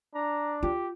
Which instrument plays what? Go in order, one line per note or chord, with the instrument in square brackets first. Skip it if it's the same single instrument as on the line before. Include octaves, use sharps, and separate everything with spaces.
[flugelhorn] D4 [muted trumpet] A#5
[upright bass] F4 [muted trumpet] G4